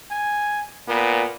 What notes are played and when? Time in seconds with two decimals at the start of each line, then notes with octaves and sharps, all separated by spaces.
0.11 G#5
0.88 A#2 B3